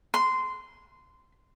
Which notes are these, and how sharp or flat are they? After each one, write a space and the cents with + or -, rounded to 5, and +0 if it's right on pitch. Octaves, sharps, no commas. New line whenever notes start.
C6 -15